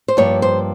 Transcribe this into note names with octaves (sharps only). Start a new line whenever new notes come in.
C5
G2 F3 A#3 C#5
C5